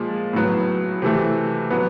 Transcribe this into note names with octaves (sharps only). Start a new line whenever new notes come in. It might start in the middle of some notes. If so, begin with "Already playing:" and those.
Already playing: A#2 F3 G#3
A2 F#3 B3
C3 E3 A3
F#3 B3